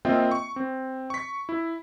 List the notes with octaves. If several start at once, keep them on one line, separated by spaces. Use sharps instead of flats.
A#3 C4 F4 D#5 E5 G5
C#6
C4
C#6 B6
E4